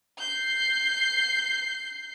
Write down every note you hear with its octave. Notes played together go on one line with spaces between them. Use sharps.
G6 C7